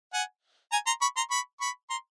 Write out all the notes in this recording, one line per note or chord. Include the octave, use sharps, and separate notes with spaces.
F#5 G#5
G#5 A#5
A#5 C6
B5 C#6
A#5 C6
B5 C#6
B5 C#6
A#5 C6